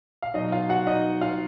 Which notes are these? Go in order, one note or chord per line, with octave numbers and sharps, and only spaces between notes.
F5
B2 F#3 D#4 D#5
F4 F5
F#4 F#5
D#4 D#5
F4 F5